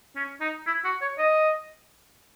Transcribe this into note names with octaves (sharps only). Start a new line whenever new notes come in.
C#4
D#4
E4
F#4
C#5
D#5